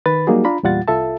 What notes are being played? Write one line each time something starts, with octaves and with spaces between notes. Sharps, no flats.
D#3 B4 B5 A6
F#3 G3 A#3 D#4 F#4 G#4
D4 F4 A#5 B5
E2 A#2 G3 F4 F#5 A6
C2 F4 A4 E5 A5